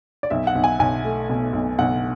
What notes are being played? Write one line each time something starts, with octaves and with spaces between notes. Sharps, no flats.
D5
B1 E5
F#5
B1
G#5
B1 G#5
A3
B2
B1
B1 F#5